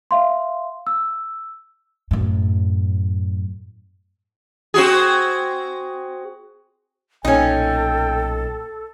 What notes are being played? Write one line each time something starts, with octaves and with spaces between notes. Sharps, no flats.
E5 F5 C6
E6
F#2 A2
C4 F#4 G#4
B1 A#2 C#4 D#4 A4 G5